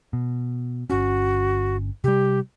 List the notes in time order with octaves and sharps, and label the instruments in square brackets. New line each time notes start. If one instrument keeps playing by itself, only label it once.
[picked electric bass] B2
[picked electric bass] G1 C#4 [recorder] F#4
[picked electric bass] C3 G3 [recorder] G4